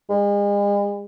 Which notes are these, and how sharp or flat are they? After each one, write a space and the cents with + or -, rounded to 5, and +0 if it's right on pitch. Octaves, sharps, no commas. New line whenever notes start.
G#3 -40